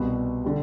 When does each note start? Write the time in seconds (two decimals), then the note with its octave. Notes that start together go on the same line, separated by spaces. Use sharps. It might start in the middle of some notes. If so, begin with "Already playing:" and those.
Already playing: C2 B2 G3 B3
0.44 D3 G3